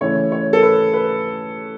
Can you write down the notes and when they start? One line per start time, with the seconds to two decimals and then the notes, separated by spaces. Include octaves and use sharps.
0.01 C#3 E3 A3 C#4 E4 C#5
0.32 C#5
0.53 A4
0.62 B4
0.93 B4